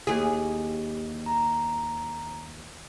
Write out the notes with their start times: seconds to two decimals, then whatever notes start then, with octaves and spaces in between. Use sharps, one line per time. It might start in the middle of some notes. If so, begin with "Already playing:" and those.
0.07 D#2 G4 G#4
1.26 A#5